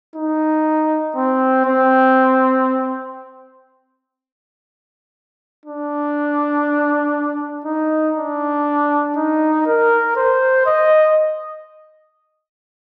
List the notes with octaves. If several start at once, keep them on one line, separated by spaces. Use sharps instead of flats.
D#4
C4
C4
D4
D#4
D4
D#4
A#4
C5
D#5